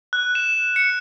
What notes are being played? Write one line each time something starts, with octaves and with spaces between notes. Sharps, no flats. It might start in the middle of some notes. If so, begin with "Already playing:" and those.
F#6
E7
C#7